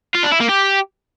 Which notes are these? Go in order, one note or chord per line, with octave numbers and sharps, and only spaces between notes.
F4
D4
E4
A#3
G4